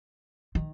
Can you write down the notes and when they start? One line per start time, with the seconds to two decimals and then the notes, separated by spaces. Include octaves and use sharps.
0.55 D#3